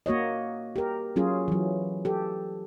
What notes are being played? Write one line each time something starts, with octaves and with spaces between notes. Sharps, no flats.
A#3 F#4 C#5 D#5
G4 A#4
F#3 C#4 F4 G#4
E3 F#3
G4 A4